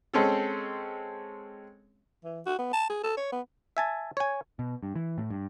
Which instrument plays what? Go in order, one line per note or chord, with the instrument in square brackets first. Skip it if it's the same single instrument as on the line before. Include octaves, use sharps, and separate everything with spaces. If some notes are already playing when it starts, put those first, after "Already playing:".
[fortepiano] G#3 C4 C#4 A4
[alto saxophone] E3
F#4
B3
A5
G#4
A4
C#5
B3
[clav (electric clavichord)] E5 G#5 A5
C#5 G#5
[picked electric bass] B2
G2
E3
A2
G2